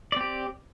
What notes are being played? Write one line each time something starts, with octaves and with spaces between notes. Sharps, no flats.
C4 G4 D5